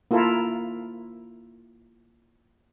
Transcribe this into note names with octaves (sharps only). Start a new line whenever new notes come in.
A#3 E4 F4 A4 A#4